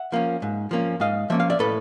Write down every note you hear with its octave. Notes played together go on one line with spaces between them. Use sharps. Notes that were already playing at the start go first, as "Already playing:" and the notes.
Already playing: E5 F#5
F3 A#3 C#4
G#2
F3 A#3 C#4
G#2 D#5 F5
F3 A#3 C#4 E5
F5
D5 E5
A2 A4 B4